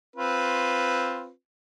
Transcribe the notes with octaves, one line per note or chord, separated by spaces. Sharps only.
C4 F4 B4